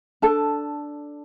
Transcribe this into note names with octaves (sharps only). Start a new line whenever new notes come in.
D4 A4 A5